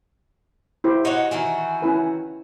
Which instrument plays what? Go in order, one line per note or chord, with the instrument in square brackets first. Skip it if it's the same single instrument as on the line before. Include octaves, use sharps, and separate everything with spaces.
[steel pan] E4 G4 C5
[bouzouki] D#4 F#4 C#5 [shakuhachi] F#5
[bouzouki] D#3 E3 F#4 [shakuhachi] G#5
[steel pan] C#4 E4 B4